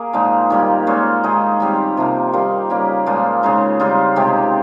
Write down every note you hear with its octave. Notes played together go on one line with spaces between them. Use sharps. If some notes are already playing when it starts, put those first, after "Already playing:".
Already playing: A#3 G#4 A#4
A#2 F3 G#3 D#4
D#3 G3 A#3
A#2 G#3 C#4 F4
D#3 G#3 D#4
D#3 G3 C4 D#4
C3 F3 A#3
D#3 G3 A#3 D#4 F4
C#3 G3 A#3
A#2 F3 G#3 D#4 F4
C#3 G#3 D#4
C#3 G3 C4 D#4 F4
C3 D#3 G#3 C4 G4